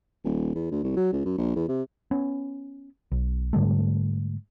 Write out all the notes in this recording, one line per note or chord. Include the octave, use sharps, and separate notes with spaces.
D#1
E2
D2
C2
F#3
C#2
F#2
A#1
E2
C3
B3 C#4
B1
G#2 D3 G3 A3